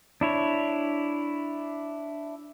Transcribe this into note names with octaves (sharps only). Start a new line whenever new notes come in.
D4 E4 C#5